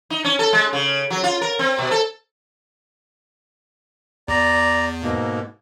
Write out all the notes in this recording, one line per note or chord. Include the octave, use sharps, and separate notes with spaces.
D#4
C#4
A4
G#3
C#3
F#3
F4
A#4
C4
B2
A4
E2 D5 A#5
G#2 B2 A#3